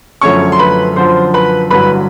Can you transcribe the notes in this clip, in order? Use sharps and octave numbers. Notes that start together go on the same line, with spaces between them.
F#2 D3 F3 A3 C#4 C#5 C#6
C6
B4 B5
F#2 D3 F3 C5 C6
B4 B5
A1 G2 D3 F#3 B4 B5